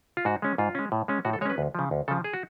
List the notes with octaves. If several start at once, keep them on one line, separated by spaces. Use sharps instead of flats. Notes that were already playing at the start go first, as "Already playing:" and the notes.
F4
G#2 F#4
G#3 C#4
G#2 F4
G#3 C#4
A2
G#3 C#4
A2 F#4
A4
G#3 C#4 B4 C#5
D2
C#3 F3
D2
C#3 F3 A4
G#4
F#4